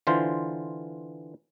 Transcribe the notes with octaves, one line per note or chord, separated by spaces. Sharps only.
D3 E3 F4 C5